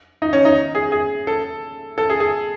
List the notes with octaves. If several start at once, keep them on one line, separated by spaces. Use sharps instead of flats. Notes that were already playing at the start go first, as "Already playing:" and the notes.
D#4
C#4
D#4
G#4
G#4
A4
A4
G#4
G#4